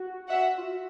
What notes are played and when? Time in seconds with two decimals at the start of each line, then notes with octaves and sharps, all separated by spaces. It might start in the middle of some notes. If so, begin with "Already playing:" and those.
Already playing: F#4
0.28 E5 F#5
0.58 F4
0.63 F#4